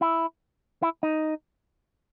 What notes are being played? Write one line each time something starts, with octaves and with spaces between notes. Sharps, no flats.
E4
E4
D#4